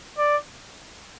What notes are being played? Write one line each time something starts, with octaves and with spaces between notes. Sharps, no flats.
D5